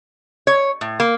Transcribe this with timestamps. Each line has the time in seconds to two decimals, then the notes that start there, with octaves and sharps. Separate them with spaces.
0.47 C#5
0.81 A2
1.00 A#3